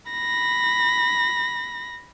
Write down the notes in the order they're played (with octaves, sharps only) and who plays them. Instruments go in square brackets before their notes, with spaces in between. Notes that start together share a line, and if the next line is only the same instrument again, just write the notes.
[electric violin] B5 A#6